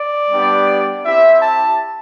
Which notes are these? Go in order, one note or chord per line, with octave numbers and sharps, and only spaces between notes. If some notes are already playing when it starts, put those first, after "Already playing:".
Already playing: D5
G3 B3 D4 G4
C4 E4 G4 E5
A5